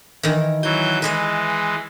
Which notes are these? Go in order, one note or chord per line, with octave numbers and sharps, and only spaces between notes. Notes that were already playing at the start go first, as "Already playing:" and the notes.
D#3 E3
E3 F#3 G#5 G6
E3 G#3 B4 D#5 E5